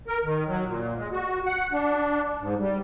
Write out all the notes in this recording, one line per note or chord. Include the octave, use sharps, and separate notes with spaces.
A#4
D#3
F#3
A#2
G#3
F#4
F#5
D4
G#2
G3